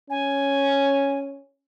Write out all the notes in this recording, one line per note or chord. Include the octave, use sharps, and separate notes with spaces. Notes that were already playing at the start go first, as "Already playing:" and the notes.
C#4 G#5